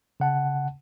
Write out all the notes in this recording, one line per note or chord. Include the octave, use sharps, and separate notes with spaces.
C#3 F#5 A5